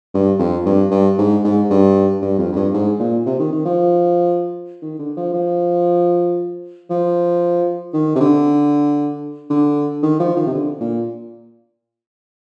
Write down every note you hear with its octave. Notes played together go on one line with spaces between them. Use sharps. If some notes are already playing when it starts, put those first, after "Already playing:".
G2
F2
G2
G2
G#2
G#2
G2
G2
F2
F2
G2
G#2
A#2
C3
D#3
D#3
F3
D#3
D3
F3
F3
F3
D#3
C3
D3
D3
D#3
F3
D#3
C3
D3
A#2